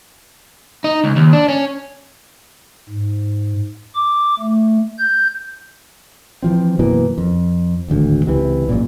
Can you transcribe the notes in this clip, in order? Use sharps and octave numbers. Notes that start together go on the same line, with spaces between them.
D#4
C#2
D#2
D4
C#4
G#2
D6
A3
G6
E3 F3 C4
F#2 B2 E3 A#3
F2
D1 G#1 D2
C#2 C3 E3
A1 F#2 A#2